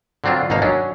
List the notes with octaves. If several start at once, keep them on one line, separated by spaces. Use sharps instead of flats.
D3 F#3 C4 D4 F4
G#1 B2 A#3 D#4 F5 A5
F#3 C#4 D4